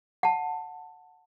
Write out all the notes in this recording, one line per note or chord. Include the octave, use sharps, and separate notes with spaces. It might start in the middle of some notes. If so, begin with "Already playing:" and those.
F#5 A5